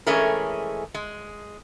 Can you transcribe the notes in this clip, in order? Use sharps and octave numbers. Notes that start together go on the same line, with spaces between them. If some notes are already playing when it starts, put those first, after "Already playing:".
E3 G#3 A3 C#4 G#4 A#4
G#3